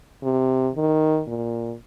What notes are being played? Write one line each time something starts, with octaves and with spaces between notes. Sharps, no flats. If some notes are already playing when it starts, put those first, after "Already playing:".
C3
D#3
A#2